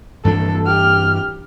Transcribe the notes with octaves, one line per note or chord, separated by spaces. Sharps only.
G2 E3 D4 A4
G4 F6